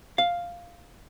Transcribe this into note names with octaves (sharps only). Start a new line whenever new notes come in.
F5